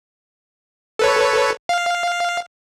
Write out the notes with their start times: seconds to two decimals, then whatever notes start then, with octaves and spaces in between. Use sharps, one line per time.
0.99 A4 B4 C#5
1.69 F5